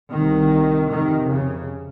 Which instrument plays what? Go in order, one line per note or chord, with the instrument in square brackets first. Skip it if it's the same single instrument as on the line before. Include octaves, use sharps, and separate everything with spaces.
[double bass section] C2 C3 D#3
F2 C3 D#3
C#3